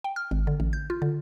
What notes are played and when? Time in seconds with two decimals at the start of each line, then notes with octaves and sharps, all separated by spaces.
0.04 G5
0.16 F6
0.31 G#1
0.47 D3
0.60 A1
0.73 G6
0.90 F4
1.02 D3